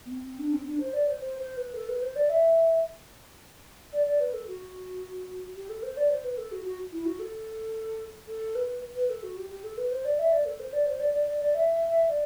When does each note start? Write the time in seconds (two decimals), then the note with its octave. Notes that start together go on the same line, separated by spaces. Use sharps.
0.06 B3
0.11 C4
0.25 C4
0.39 D4
0.53 C4
0.66 D4
0.80 C5
0.93 D5
1.07 C5
1.21 C5
1.38 C5
1.57 B4
1.75 A4
1.88 B4
2.02 C5
2.16 D5
2.29 E5
3.92 D5
4.06 D5
4.20 B4
4.33 A4
4.47 F#4
5.56 G4
5.69 A4
5.83 C5
5.97 D5
6.10 C5
6.24 B4
6.37 A4
6.51 F#4
6.65 F#4
6.92 E4
7.05 F#4
7.19 A4
8.28 A4
8.55 B4
8.95 B4
9.09 A4
9.23 F#4
9.37 G4
9.50 G4
9.63 A4
9.77 B4
9.91 C5
10.05 D5
10.19 E5
10.32 D5
10.45 A4
10.59 C5
10.73 D5
10.86 C5
11.00 D5
11.13 D5
11.27 D5
11.40 D5
11.54 E5
12.09 D5